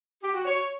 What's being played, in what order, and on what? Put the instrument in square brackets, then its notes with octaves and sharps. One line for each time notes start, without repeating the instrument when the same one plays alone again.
[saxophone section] G4
F#4
C#5